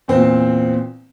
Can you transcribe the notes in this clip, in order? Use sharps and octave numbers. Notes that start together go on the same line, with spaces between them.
E2 A#2 C4 C5